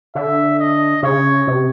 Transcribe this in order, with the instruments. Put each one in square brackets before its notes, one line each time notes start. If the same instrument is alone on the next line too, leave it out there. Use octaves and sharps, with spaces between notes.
[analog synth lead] D3 [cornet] E5
[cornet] D#5
[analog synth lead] C#3 [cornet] C#5
[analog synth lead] C3